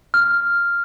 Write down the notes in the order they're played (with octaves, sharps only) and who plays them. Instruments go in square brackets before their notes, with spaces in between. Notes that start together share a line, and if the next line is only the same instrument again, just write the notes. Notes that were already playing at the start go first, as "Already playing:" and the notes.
[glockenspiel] F6